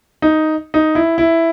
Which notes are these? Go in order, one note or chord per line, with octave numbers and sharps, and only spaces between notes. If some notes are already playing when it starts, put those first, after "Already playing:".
D#4
D#4
E4
E4